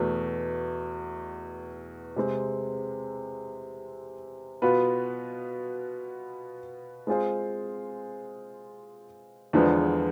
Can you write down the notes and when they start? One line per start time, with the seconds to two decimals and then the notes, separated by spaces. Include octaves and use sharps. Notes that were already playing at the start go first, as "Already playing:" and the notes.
Already playing: E2 B2 A3
2.16 C3 G#3 C4
4.62 B2 B3 F4 B4
7.07 G#3 C4 F4 G#4 C5
9.53 E2 D3 F3 G#3 B3